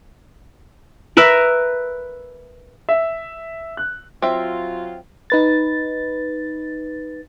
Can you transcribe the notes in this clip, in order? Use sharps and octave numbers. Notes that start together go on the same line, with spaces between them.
A#4 B4 E5
E5
F#6
F#3 C4 F4 E5
D#4 B4 A6